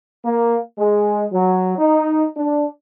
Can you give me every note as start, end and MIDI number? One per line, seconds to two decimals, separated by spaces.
0.25 0.58 58
0.78 1.25 56
1.32 1.74 54
1.78 2.24 63
2.37 2.66 62